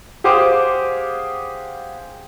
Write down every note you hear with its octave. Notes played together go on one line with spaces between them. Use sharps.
G4 G#4 C5 F5 F#5 D6